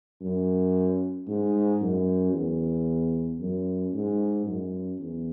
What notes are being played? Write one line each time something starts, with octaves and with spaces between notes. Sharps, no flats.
F#2
G#2
F#2
E2
F#2
G#2
F#2
E2